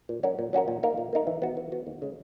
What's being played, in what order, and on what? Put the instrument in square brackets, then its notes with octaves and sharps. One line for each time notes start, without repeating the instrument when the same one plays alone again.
[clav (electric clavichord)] A#2
F#3 C#4 F#4 A#4
A#2
F#3 C#4 F#4 A#4
A#2
A#3 D#4 A#4
A#2
A#3 D#4 A#4
E3
B3 F#4
E3
B3 F#4
D#2
C#3 G#3